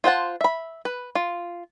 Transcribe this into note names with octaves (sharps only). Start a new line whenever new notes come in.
F4 C5 F#5 A5
E5 B5
B4
F4